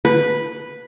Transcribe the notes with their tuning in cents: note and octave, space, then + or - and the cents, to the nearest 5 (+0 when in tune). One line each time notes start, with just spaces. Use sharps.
B4 -5